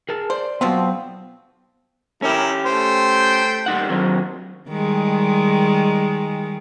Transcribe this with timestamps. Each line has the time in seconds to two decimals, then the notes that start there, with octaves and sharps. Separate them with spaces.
0.09 G#4 A#4 A5
0.30 C5 D5
0.61 B2 F3 F#3 B3 C4
2.22 C#4 E4 G4 A#4
2.66 A3 C5 G5
3.66 G3 D#4 F#5
3.90 D#3 F#3 C4
4.69 D#3 G3 G#3